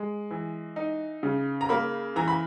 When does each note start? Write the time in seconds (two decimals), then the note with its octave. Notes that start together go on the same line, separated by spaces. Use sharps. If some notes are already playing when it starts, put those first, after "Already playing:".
Already playing: G#3
0.31 E3
0.76 D#4
1.23 C#3
1.61 A#5
1.69 A#3 B5
2.16 E3 A#5
2.28 B5